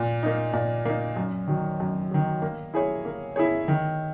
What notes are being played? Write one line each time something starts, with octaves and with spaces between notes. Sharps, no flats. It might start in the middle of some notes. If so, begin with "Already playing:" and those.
Already playing: A#2
A#3 D#4
A#2
A#3 D#4
F#2
D#3 F#3
F#2
D#3 F#3
A#3
E4 G#4 C#5
A#3
E4 G#4 C#5
D#3